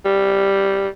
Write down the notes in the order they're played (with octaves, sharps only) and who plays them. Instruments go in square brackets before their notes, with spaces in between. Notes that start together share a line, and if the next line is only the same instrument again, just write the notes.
[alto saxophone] G3